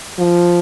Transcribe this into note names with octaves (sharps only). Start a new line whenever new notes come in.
F3